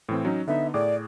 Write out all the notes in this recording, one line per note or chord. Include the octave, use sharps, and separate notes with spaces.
A2 E3 C4
F#3 C#4 D#4
D3 B3 D#4 E5
A2 G#4 D5 D6